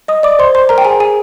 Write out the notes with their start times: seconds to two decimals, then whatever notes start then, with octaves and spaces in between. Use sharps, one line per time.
0.08 D#5 D#6
0.23 D5 D6
0.39 C5 C6
0.55 C5 C6
0.69 A#4 A#5
0.78 G5
0.85 G#4 G#5
1.00 G#4 G#5